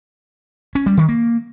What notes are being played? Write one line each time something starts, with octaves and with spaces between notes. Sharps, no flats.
C#4
G3
D#3
A#3